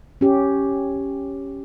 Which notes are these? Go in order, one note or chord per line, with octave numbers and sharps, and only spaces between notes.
C#4 G4